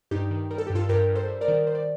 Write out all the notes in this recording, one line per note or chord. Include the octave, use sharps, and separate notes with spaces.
G2 D#4 G4
D#3
G3 A#4
A4
G2 G4
F4 A4
G2 G4 A#4
G2
A4 C5
G3
A#4 D5
D#3
D#3 C5
D5